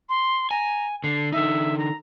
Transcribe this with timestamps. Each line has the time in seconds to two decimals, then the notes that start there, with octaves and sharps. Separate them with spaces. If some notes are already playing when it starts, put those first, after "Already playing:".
0.09 C6
0.51 G#5 A#5
1.04 D3 C7
1.32 D3 D#4 E5
1.78 A#5